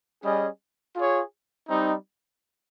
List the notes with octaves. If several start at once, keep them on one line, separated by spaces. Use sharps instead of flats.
G3 C#4 G#4 D#5
F4 G#4 C#5
G3 C4 D#4